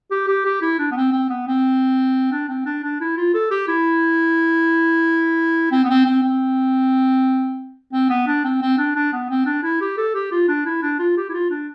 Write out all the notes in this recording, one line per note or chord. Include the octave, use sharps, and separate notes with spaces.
G4
G4
G4
E4
D4
B3
C4
C4
B3
C4
D4
C4
D4
D4
E4
F4
A4
G4
E4
C4
B3
C4
C4
C4
C4
B3
D4
C4
C4
D4
D4
B3
C4
D4
E4
G4
A4
G4
F4
D4
E4
D4
F4
G4
E4
F4
D4